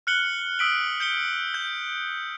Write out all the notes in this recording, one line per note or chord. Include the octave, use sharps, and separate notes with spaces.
F6 F#6 C#7 F#7 G7
D#6 E6 B6 D7 F#7
G6 C#7 G7
G6